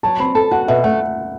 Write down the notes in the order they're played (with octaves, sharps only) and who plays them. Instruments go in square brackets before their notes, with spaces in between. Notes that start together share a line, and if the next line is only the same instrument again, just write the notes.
[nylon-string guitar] F#3 [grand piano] A5
[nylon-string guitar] C4 [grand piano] B5
[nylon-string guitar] A4 [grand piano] A5
[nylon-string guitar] F#4 [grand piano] F#5
[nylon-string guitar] B2 [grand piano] E5
[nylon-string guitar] A3 [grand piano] F#5